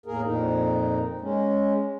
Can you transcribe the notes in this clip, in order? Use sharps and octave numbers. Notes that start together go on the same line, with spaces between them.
E2 A2 A#3 G#4 A#4
F2 A#2 D#4
G#3 C#4